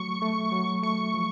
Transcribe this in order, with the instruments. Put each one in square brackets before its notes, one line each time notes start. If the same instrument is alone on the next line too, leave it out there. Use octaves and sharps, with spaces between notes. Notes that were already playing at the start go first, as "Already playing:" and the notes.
Already playing: [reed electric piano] F#3 A3 [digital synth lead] C#6
[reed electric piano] A3
F#3
[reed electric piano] A3 [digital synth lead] C#6
[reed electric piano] F3